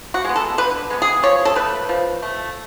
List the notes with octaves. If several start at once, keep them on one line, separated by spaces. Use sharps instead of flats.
F#4
G#3 B3
A4
D3 B4
G#3 B3
G#4
F3 C#5
A4
A3 B4
F3
A3